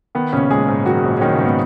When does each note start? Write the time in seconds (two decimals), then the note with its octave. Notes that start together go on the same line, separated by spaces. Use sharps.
0.15 D#3 B3
0.33 A#1 C#3 C#4
0.51 A#1 G#3 G#4
0.68 G#2
0.86 D#3 F#3 F#4
1.03 A#1
1.18 C#4
1.21 A#1 D#3 D#4
1.33 C#3 C#4
1.39 G#2
1.45 B3